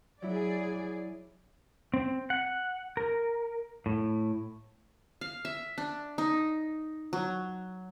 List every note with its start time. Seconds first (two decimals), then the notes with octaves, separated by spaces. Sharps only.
0.22 F#3 E4 G#4 D5
1.94 C4
2.30 F#5
2.97 A#4
3.86 A2
5.21 F5
5.45 E5
5.78 D4
6.18 D#4
7.13 F#3